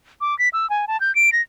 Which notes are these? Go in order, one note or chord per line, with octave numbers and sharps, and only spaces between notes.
D6
B6
E6
G#5
A5
G6
D7
A#6